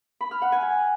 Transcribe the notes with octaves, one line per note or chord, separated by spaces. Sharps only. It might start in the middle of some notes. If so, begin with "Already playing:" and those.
B5
F6
F#5
G#5